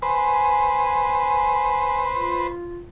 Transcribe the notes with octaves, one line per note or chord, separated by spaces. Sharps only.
B4 C5 G#5
F4